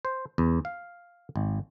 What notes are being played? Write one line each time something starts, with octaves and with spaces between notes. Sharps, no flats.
C5
E2
F5
G#1